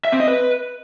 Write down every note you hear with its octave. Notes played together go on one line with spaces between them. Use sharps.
E5
C4
D#5
B4